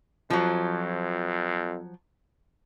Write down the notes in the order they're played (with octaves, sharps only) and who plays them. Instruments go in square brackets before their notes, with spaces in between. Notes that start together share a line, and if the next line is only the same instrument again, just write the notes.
[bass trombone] F2 [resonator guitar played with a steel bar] F3 F#3